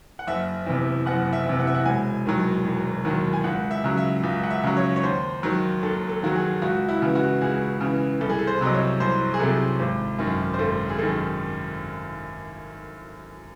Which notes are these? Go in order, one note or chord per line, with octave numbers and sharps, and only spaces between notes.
F#5
F#1 E5
E2 C3
F#1 F#5
E5
E2 C3
F#5
E5
F#5
E1 G#5
D#2 D#3 F#3
E1
D#2 D#3 F#3
G#5
C#2 F#5
E5
C#3 F#3
E5
C#2
F#5
E5
C#3 F#3
C#5
C#5
D#2 C5
D#3 F#3
D#2 A4
A4
D#3 F#3 F#4
G#4
C#2 F#4
E4
C#3 E3
F#4
C#2 G#4
C#3 E3
C2 A4
G#4
A4
C5
C3 F#3 D#5
C#5
C2 C5
G#4
C3 F#3 A4
G#1
F#2 D#3
C5
G#1 A4
G#4
F#2 D#3 A4